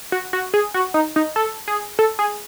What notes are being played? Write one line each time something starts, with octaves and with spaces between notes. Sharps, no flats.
F#4
F#4
G#4
F#4
D#4
D#4
A4
G#4
A4
G#4